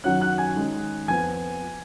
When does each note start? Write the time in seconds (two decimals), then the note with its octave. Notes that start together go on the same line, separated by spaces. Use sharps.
0.04 F#2 D#3 F#3 C#4 F#5 F#6
0.21 F#5 F#6
0.38 G#5 G#6
0.55 D#3 G#3 C#4
1.08 F2 F3 B3 G#5 G#6